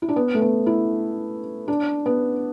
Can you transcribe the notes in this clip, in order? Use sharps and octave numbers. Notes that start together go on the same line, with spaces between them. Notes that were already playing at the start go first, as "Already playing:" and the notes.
E4
D4
B3
A3
B3
E4
D4
B3